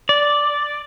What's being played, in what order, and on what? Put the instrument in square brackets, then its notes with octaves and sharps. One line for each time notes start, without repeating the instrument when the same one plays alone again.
[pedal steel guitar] D5